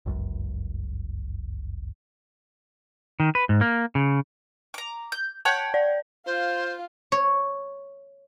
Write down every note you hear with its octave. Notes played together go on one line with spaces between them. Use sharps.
G1 C#2 F#2
D#3
B4
G#2
A#3
C#3
A#5 D6
G6
C#5 F#5 G5 A5 G6
D5
F4 C5 F5
C#5